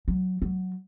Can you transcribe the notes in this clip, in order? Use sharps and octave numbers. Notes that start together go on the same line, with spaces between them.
F#3
F#3